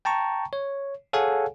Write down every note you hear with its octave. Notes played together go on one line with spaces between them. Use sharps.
G5 A5 A#5 C#6
C#5
G#4 A4 C#5 F5 F#5 G#5